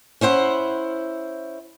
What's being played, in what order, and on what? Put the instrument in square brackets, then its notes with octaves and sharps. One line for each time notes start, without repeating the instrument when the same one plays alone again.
[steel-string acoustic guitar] C#4 E4 C5 F#5